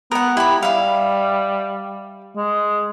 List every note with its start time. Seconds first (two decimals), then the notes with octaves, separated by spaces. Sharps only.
0.11 B3 A#4 F#5
0.37 E4 G4 B5
0.63 G3 E5 F5
2.36 G#3